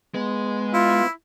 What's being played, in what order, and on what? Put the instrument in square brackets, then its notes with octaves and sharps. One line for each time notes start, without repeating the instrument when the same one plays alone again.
[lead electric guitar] G#3 [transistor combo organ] B3
[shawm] E4 [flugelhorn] F4